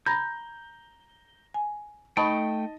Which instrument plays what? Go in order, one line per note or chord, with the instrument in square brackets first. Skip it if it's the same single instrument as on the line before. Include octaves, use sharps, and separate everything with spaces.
[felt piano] A#5 [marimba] B5 G#6 A#6 [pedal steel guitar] G6
[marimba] G#5
[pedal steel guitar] A3 G5 [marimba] D#4 B5 C#6 [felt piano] D#5 A5